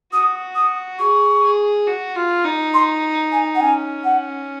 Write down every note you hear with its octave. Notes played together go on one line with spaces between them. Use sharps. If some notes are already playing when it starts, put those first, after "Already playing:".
F#4 D#6
D#6
G#4 C#6
G#4
F#4
F4
D#4
C6
G#5
F#5
C#4 G#5
F#5